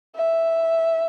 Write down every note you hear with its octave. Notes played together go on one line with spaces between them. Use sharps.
E5